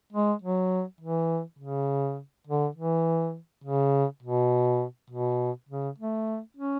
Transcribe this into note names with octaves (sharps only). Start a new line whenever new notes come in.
G#3
F#3
E3
C#3
D3
E3
C#3
B2
B2
C#3
A3
C#4